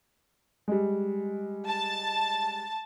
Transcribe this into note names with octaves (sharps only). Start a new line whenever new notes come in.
G3 G#3
A5